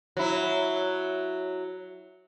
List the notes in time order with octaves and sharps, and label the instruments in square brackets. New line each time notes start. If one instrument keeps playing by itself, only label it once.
[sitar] F#3 E4